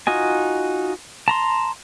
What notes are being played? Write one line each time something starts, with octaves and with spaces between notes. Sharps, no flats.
D#4 F4 F#4 D#5 G#5
A5 A#5 C6